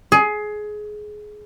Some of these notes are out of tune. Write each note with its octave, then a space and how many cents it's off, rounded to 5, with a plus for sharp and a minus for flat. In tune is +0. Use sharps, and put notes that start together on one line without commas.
G#4 +20